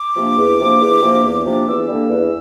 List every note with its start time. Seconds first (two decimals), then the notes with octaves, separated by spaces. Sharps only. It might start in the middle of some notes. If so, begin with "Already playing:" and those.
Already playing: D6
0.16 C3 F3 A#3 D4
0.37 E2
0.59 C3 F3 A#3 D4
0.81 E2
1.02 C3 F3 A#3 D4
1.24 E2
1.45 C3 F3 A#3 D4
1.67 E2 E6
1.89 D3 G3 A#3 D4
2.10 E2